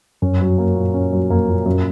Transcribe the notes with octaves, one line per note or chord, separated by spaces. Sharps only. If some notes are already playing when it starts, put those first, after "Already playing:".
F#2 C#4
F#3
A#3
A#2
C#4
F#3
F2 A#3
A#2
F#2